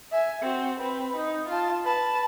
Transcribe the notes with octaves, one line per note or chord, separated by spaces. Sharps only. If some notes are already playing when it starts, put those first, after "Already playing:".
E5 G#5
C4 F#4
C4 B4
D#4
F4 A5
B4 A5